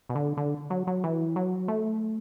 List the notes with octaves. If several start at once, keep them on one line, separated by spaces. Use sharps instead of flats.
B2
D3
D3
F#3
F#3
E3
F#3
A3